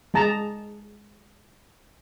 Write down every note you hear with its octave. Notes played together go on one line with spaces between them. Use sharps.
G#3 G#4 A5 A#5